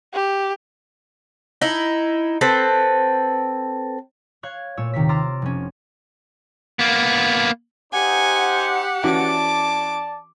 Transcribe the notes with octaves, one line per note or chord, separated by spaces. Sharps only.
G4
D#4 E4
C4 A4 B4
C#5 F5 F#6 G#6
A#2 A3 C#5 E6
D#2 C3 D#3 A#4 C#5 B6
A#5 C6 D6 E6 F6 A6
F1 C#4
A#3 B3
D#4 G4 C5 F#5 G#5
E3 C#4 F#4 D5 A5 D6